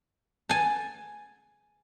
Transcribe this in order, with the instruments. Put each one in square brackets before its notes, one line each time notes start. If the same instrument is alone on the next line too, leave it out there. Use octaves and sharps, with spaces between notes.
[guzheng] G#5 A5